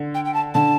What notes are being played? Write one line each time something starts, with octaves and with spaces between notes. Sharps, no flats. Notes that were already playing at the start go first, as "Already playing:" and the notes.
Already playing: D3
G5
G5
A5
D3 A5